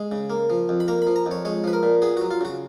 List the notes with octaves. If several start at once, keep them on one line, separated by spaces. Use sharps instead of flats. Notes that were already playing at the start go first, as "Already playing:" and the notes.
Already playing: G#3
C#3
A#3
F3
F2
B5
A#3 A#5
F3 B5
A#5
F2 C#5
G#3 C#5
F3 B4
A#4
A#2
B3 G#4
F#3 F#4
F4
C#3 F#4